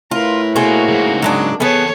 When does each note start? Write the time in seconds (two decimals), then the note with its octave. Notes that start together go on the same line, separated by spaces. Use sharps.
0.11 A2 F4 A#4 B4
0.56 B2 A#3 F#4 G#4 C5
0.88 G#2 C#3
1.22 F#3 G#3 D4
1.60 E2 B3 G#4 A4 C#5 A5